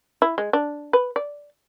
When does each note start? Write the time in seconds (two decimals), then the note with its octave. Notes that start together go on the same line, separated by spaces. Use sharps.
0.22 E4
0.38 G#3
0.53 D4
0.93 B4
1.16 D5